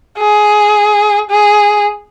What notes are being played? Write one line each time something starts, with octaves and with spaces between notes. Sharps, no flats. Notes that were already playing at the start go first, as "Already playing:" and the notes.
G#4
G#4